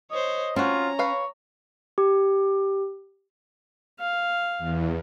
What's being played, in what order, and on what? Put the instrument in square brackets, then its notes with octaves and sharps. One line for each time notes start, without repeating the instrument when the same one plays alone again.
[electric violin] C5 C#5 [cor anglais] D#5
[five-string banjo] C4 F#4 [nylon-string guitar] C#4 [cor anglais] F4 [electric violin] A#5
[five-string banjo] B4 F5 [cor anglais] C#5
[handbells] G4
[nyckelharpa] F5
[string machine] E2